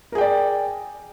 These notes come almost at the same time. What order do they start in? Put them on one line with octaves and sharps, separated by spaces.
A#4 G#4 G5 D5